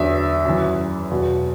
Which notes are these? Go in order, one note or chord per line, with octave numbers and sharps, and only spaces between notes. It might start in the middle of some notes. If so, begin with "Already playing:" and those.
Already playing: E2 D3 F#3 E5
F#2 E3
E2 B2 F#3